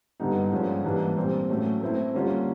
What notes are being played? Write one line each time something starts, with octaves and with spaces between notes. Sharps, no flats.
G2 D3 G3 B3 D#4
G2 D3 F3 G#3 C#4
G#2 E3 G3 A#3 D4
A#2 G3 C4
A2 F#3 A3 C#4
A3 C4 E4
D3 G3 A#3 C#4 F4